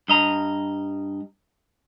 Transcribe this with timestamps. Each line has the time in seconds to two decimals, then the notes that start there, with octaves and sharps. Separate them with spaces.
0.08 G2 D#5 A#5